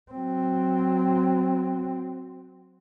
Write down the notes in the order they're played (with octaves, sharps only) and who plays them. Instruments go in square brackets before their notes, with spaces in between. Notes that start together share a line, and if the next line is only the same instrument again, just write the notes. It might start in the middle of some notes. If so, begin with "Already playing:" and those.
[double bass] F#3 C4